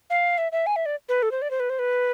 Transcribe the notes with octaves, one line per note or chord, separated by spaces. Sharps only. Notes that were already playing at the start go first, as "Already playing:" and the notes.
F5
E5
E5
G#5
E5
D5
B4
A4
C5
D5
C5
B4
C5
B4